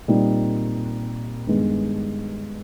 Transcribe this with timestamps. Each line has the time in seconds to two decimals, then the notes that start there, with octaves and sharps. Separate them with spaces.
0.08 A#2 G3 C4 D#4
1.47 G2 D#3 G#3 B3